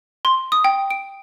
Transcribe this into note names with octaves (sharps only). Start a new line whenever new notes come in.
C6
D#6
G5
D7